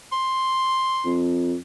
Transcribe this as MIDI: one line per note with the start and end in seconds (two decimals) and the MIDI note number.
0.13 1.19 84
1.05 1.55 41